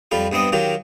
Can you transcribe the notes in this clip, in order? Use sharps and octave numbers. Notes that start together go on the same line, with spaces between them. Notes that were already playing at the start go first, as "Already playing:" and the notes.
F2 G3 F4 B5
G2 B3 C4 D#5
D#3 F#3 F4 G4